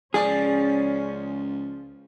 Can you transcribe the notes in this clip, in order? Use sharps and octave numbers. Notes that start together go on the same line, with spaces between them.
C#2 F3 C#4 G#4 D5